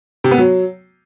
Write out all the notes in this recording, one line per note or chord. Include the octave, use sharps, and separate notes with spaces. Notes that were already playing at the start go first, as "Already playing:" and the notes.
C3
B3
F#3